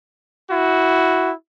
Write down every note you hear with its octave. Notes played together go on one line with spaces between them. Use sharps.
E4 F#4